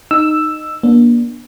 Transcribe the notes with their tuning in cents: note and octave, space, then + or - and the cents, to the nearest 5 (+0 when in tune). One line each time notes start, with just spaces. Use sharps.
D#4 -15 E6 +5
A#3 +35 D4 +0